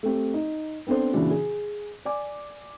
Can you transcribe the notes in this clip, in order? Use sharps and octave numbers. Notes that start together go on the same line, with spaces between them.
A3 C4 G4
D#4
B3 C4 D4 A4 C5
A#2 C#3 E3 D4 F#4
G#4
D5 G#5 D6